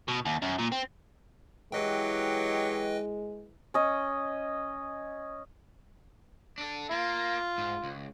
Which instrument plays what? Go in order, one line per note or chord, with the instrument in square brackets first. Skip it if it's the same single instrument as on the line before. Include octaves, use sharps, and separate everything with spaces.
[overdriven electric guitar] B2
D#2
F#2
A#2
C4
[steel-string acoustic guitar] E3 [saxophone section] F#3 G4 C#5 [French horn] G#3 [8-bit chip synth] B4 D#5 G5
[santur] C#4 D#5
[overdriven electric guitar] D4 A4
[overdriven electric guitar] A#3 [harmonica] F4
[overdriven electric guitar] G#2
C#2